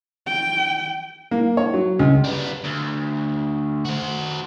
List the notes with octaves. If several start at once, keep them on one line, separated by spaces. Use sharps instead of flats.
G5
A#3
C#5
F#3
C#2
G3 B3
D2
F#4 C5